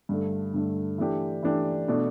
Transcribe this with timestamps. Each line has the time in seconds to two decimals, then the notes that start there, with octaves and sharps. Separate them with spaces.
0.09 G2 D3 A3
0.54 G2 D3 A3
0.98 E3 A3 D4 G4
1.42 E3 A3 D4 G4
1.88 B2 A3 D4